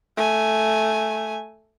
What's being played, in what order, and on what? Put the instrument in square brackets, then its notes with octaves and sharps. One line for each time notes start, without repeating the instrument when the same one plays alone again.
[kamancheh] A3 G#5